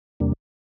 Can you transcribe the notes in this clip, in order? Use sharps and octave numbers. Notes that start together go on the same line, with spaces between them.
E2 C3 G3 A#3 D4